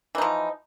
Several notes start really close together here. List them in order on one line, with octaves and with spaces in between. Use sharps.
E3 D#4 F3